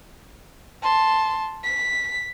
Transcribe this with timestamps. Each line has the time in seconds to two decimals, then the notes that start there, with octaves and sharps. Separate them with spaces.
0.82 A5 C6
1.63 B6